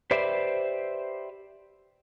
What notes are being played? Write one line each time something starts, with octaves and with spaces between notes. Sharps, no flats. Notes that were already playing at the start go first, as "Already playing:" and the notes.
G4 B4 C5 D5 E5